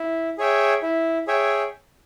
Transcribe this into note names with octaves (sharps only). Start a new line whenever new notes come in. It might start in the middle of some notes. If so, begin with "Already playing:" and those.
Already playing: E4
G#4 C#5 E5 G5
E4
G#4 C#5 E5 G5